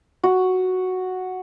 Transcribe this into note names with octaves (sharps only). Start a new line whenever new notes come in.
F#4